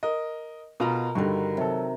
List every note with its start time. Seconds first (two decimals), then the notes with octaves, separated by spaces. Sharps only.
0.03 A#4 D#5
0.80 B2 F4 A#4 A#5 C6
1.15 G2 D3 D#3 G3 F#4 A#4
1.57 C3 F#3 A4